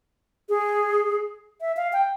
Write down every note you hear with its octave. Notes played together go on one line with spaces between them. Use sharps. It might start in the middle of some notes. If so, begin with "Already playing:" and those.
G#4
E5
F5
G5